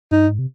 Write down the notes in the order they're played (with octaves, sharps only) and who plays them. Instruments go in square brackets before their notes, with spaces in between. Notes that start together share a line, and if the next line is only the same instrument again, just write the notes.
[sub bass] G2 [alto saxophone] D#4
[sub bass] G#2
C3